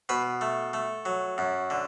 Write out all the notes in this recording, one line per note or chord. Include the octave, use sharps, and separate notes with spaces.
B2 B4
A3
A3
F#3
F#2
D3